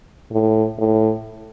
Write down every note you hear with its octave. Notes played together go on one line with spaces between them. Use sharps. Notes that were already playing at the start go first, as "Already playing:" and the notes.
A2
A2